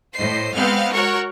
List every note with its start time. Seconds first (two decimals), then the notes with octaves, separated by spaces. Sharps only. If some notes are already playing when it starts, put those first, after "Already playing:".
0.15 A2 C5 D#5 C7
0.56 G#3 B3 C4 F5 F#5 F6
0.93 F#4 A#4 C#5 F#5 C#6